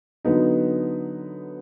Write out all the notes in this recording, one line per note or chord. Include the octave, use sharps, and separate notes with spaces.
D3 F#3 B3 D#4